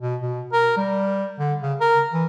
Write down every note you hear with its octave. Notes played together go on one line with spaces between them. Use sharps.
B2
B2
A#4
G3
D3
C#3
A#4
E3